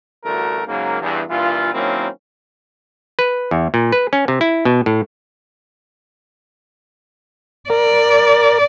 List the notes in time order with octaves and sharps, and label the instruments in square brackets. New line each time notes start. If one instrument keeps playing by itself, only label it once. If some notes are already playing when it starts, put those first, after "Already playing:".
[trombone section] A1 D2 G2 A3 F#4 A#4
G#2 C#3 F#3 A#3
E2 G2
G2 A#2 E3 F4
D#3 F#3 A#3 C4 C#4 E4
[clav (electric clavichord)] B4
E2
A#2
B4
C#4
C3
E4
B2
A2
[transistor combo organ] A#4 [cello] D5